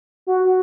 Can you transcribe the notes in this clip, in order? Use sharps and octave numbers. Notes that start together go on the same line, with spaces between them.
F#4
F#4